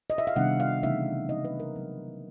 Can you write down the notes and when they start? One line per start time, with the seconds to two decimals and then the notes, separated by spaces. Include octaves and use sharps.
0.10 D#5
0.18 E5
0.27 F5
0.36 C3 D#3 G3 B3 D4 F#5
0.60 F5
0.83 C#3 E3 A3 C4 D#4 E5
1.28 D#3 F#3 A#3 D#4 D#5
1.45 B4
1.60 A#4
1.76 F#3 B3 D#4